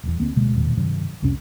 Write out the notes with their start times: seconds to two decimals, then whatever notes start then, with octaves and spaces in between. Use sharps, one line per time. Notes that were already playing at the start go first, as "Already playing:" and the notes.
0.03 D#1 E2
0.20 D2 A#3 C4
0.35 D1 D2 B2 G#3
0.55 E1 D#2 A#2 D#3
0.77 G2 C3 D#3 F#3
1.22 C2 F2 C3 C#4